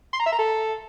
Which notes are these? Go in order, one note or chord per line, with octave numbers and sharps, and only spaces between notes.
C6
A#5
E5
A#5
A4